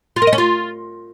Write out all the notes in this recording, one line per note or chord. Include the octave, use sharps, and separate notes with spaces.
F4
A#4
D#5
C#4
F4